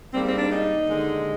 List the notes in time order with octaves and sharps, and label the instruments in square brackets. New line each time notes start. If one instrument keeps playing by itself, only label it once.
[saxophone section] G#2 G3 A#3 C4
C4
D4
D#4
D#2 D3 G#3